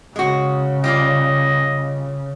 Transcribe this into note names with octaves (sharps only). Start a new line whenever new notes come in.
C#3 G#3 F#4
G3 F4 D5 D#5